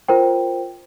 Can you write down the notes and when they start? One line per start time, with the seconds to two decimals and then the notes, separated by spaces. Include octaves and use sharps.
0.08 F4 A#4 C5 G5